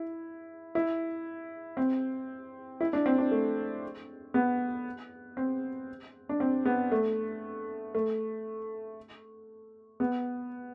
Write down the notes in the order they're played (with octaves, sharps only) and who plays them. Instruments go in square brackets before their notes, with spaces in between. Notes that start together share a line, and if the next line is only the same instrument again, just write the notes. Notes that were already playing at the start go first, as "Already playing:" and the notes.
Already playing: [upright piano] E4
E4
C4
E4
D4
C4
D4
A3
B3
C4
D4
C4
B3
A3
A3
B3